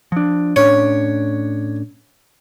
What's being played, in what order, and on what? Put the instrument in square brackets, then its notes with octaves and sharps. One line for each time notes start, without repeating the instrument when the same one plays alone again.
[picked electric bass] F3 D4
[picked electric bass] A2 C#4 D4 [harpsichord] C#5